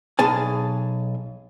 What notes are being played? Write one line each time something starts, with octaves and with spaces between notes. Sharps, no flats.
B1 G#4 G#5 A5